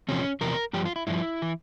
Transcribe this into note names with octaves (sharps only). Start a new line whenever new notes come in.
E2 C3 F3 C#4
E2 C3 F3 A#4
G2 F3 G4
F4
E4
G2 F3 E4
E3